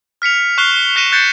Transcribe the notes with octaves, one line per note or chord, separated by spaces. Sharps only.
F6 B6 C#7 F7
C#6 F6 F#6 C7 F7 G7
G7
F#6 A#6 B6 C#7 D#7 E7
F#6 G6 A6 C7 C#7